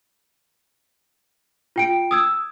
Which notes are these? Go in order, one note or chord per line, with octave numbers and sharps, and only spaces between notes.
F4 G5 D7
D#6 E6 G#6